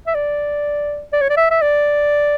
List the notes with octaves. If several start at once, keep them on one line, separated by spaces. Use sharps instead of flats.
E5
D5
D5
C#5
D5
E5
E5
D5